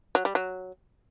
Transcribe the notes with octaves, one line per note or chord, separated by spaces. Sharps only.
F#3
G3
F#3